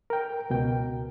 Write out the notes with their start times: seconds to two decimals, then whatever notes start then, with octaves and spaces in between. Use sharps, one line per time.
0.10 A#4 G5
0.50 C#2 B2 G5